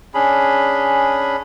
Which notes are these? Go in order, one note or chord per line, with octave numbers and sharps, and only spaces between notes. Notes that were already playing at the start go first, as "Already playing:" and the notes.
C#4 D4 G#4 B5